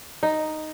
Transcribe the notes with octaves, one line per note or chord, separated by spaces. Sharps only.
D#4